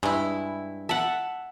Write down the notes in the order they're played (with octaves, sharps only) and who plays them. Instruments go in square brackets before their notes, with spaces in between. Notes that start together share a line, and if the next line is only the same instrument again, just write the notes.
[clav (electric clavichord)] G2 [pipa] G#3 E4
[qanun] E5 F#5 [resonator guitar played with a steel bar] A5